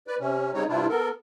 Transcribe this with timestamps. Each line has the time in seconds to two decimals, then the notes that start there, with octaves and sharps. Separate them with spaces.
0.07 B4 D5
0.20 C3 C#4
0.54 C#3 G3 C4 D#4 C#5
0.69 G2 C3 G3 D4 E4 F4
0.89 B3 A4 A#4